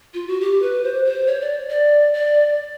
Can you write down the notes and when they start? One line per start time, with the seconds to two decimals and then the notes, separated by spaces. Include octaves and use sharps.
0.14 F4
0.28 F#4
0.41 G4
0.62 B4
0.84 C5
1.05 C5
1.27 C#5
1.41 D5
1.70 D5
2.14 D5